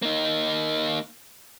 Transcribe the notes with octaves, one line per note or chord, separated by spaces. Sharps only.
A#3 D#4